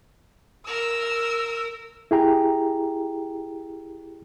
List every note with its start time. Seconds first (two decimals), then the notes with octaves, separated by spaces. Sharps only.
0.67 A#4 E6
2.11 E4 G4 G#4 G5 A#5